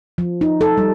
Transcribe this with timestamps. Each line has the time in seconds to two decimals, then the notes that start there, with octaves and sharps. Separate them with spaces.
0.18 F3
0.41 D#4
0.61 A4
0.78 G3